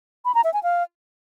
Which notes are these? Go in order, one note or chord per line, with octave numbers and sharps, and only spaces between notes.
B5
A#5
E5
G#5
F5